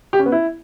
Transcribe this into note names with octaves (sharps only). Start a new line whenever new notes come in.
G4
C#4
B3
E4